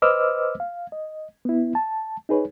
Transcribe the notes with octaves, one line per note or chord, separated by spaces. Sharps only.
B4 C5 D#5 D6 E6 F6
F5
D#5
B3 E4
A5
D#4 G#4 B4 C#5